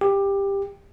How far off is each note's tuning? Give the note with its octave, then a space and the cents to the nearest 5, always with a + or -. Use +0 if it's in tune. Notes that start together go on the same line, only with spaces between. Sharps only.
G4 +15